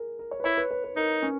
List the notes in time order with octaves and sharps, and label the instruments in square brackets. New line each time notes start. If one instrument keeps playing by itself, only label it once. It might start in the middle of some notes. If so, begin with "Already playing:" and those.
Already playing: [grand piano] G#4 A#4
A#4
C#5
B4
[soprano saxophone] E4 [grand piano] C#5
[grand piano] B4
B4
B4
[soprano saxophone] D#4 [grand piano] A#4
[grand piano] C#4